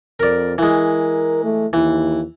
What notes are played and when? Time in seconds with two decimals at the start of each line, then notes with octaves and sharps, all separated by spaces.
0.20 F2 A#4 D5
0.58 E3 G#3 A#4
1.44 A3
1.73 D#2 E3